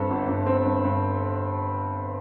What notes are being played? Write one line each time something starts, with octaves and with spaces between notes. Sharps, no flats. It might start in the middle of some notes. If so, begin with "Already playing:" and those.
Already playing: G2 C4 A4
G1
G1
C4
G2
G2